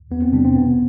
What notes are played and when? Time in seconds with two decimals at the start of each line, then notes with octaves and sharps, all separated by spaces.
0.11 E2 B3
0.22 C4
0.33 C3 G3 D4
0.45 C4
0.56 B2 B3